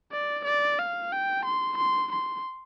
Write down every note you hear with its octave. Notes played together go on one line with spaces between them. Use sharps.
D5
D5
F5
G5
C6
C6
C6